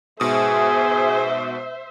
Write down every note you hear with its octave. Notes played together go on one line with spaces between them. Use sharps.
G#2 B2 G#4 C5 E5 D#6